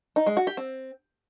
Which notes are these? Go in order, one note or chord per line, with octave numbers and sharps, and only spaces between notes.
D#4
G#3
F#4
G4
C4